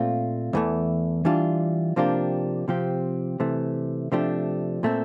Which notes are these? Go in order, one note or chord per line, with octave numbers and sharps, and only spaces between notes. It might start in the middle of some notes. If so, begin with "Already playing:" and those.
Already playing: A#2 A3 C4 F4
E2 E3 A3
E3 G3 D4 F4
C3 F3 A#3 D4 G4
C3 F3 C4 G4
C3 E3 A3
C3 F3 A3 D4 G4
A#2 A3 C4